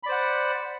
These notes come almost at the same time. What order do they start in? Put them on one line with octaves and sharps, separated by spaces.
B5 D5 C5 F#5